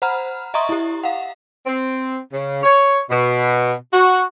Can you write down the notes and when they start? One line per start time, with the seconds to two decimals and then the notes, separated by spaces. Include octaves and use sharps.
0.02 C5 F#5 A#5 B5 F6
0.54 D#5 E5 A#5 C6 C#6 D#6
0.69 E4 G4
1.04 F5 F#5
1.66 C4
2.32 C#3
2.62 C#5
3.10 B2
3.93 F#4